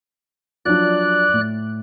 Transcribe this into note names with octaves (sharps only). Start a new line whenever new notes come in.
F3 F#3 D4 D5 F#6
A2